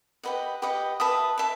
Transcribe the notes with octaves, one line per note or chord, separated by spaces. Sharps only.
G4 B4 D#5 F#5
G4 B4 D#5 F#5
B4 E5 A5 D#6
B4 E5 A5